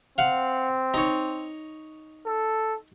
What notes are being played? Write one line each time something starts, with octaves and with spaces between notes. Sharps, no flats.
C4 F5 F#5
D#4 C#5
A4